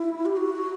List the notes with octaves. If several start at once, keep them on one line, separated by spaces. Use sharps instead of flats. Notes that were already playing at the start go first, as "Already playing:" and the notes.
Already playing: E4
G4
F#4